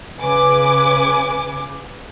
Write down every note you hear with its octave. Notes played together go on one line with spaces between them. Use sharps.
C#3 B4 G#5 D6